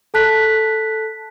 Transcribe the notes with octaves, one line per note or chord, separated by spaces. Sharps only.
A4 A5 F#6 B6